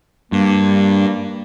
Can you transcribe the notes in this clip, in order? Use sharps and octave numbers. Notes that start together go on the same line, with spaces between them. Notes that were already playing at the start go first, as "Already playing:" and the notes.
G2 A#3